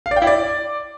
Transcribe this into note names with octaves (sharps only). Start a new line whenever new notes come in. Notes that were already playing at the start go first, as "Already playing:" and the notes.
F5
D5
G5
E4
D5